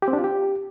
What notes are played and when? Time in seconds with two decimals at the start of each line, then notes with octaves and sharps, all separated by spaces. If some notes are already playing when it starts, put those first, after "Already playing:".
0.02 G4
0.08 C4
0.13 D4
0.19 F4
0.24 G4